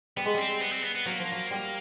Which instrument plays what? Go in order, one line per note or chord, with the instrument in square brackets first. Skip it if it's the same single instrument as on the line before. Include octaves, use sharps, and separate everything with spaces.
[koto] G3 [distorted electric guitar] B3
[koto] G#3
[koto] G3 [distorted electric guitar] C4
[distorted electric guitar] B3
C4
B3
B3
[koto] F#3 [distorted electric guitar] A#3
[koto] F3
F#3
G3